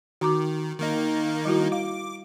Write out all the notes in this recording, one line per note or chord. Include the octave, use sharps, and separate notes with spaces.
D#3 F#4 A#5 D6
D#3 A#3 D#4
G3 E4 F#4
F5 D6